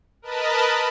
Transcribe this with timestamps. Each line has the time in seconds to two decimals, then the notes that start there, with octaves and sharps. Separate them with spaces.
0.22 A#4 B4 D#5 A5 B5